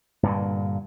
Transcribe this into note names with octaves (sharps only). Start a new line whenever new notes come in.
G2 A#2 D3